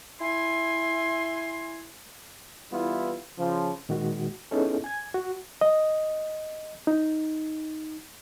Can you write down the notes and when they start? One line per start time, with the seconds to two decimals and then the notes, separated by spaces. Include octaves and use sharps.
0.20 E4 G#5 C6
2.71 E3 G3 B3 E4 F4
3.38 C#3 F3
3.89 A#2 D#3 G#3 F#4
4.51 B3 C#4 D#4 E4 G#4 A4
4.84 G#5 G#6
5.14 F#4
5.61 D#5
6.87 D#4